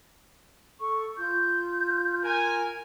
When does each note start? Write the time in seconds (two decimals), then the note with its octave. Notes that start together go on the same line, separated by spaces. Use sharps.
0.80 A4 C#6
1.18 F4 G6
2.24 A#4 G#5